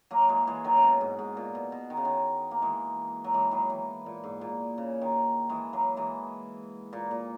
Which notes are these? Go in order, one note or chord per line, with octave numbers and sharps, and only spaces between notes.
F#3 A#3
E3 G#3
E3 G#3
D#3 F#3
C#3
B2
G#2
G#2
A#2
B2
B2
D#3
C#3
D#3
A#3
E3 G#3
F#3
E3 G#3
D#3 F#3
E3
A#2
G#2
A#2
C#3
D#3
E3 G#3
F#3 A#3
E3 G#3
A#2
A#2